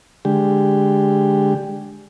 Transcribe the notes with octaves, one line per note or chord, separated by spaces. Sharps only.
D3 G#3 G4